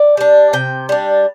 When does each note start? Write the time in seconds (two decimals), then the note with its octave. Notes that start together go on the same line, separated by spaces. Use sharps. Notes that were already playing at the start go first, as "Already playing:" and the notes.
Already playing: D5
0.17 G3 D4
0.53 C3 G5
0.89 G3 D4